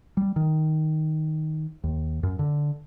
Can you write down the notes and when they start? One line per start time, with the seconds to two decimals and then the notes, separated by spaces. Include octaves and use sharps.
0.17 G3
0.36 D#3
1.84 D#2
2.23 F#2
2.39 D3